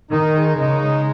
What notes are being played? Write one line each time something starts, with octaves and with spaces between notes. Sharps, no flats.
D#3 D#4
G#3
C#3 D#4
G#3